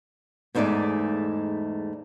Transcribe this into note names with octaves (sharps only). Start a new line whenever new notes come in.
E2 G#2 A3 D#4 D5 E5